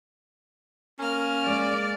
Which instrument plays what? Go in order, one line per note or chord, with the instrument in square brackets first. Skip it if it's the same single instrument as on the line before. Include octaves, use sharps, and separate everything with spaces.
[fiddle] A#3 F6 [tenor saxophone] C#4
[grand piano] G#3 [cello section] D5